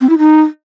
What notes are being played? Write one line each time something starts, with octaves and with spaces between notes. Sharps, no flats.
C4
E4
D#4